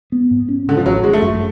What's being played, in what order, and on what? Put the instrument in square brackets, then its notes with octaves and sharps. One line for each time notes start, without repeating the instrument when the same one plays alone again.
[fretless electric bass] B3
G#2
C#4
[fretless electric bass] G#2 [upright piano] D3
[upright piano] F3
[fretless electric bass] G#1 [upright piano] F#3
[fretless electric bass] G#1 [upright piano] G#3
[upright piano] A3
[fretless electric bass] F#2